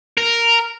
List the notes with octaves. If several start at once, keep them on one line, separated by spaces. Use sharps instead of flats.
A#4